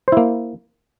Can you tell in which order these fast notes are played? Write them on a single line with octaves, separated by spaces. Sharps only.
C5 E4 A#3